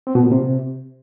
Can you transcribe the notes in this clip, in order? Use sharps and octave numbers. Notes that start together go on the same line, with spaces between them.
C4
B2
A#2
C3